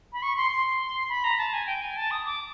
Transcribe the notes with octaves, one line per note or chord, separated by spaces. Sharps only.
B5
C#6
C6
C6
B5
A#5
A5
G#5
G5
G#5
A5
D#6
D6